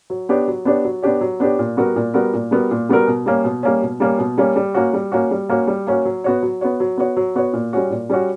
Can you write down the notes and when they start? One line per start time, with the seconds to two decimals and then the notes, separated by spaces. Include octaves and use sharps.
0.10 F#3
0.29 B3 D4 G4 C#5
0.48 F#3
0.65 B3 D4 G4 C#5
0.85 F#3
1.02 B3 D4 G4 C#5
1.21 F#3
1.40 B3 D4 G4 C#5
1.59 A#2
1.77 G3 B3 F#4 A#4
1.96 A#2
2.14 G3 B3 F#4 A#4
2.33 A#2
2.51 G3 B3 F#4 A#4
2.71 A#2
2.89 G3 B3 F#4 A#4
3.07 B2
3.26 G3 A#3 C#4
3.44 B2
3.63 G3 A#3 C#4
3.82 B2
4.00 G3 A#3 C#4
4.18 B2
4.38 G3 A#3 C#4
4.56 G3
4.74 A#3 C#4 F#4
4.93 G3
5.12 A#3 C#4 F#4
5.31 G3
5.49 A#3 C#4 F#4
5.67 G3
5.87 A#3 C#4 F#4
6.05 F#3
6.24 B3 F#4 C#5
6.43 F#3
6.61 B3 F#4 C#5
6.80 F#3
6.97 B3 F#4 C#5
7.17 F#3
7.35 B3 F#4 C#5
7.53 A#2
7.73 G3 C#4 F#4
7.91 A#2
8.10 G3 C#4 F#4